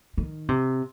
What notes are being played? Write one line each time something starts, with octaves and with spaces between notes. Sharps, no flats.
D#3
C3